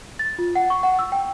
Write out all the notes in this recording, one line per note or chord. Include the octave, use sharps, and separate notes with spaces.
A6
F4
F#5
C#6
F#5
E6
G5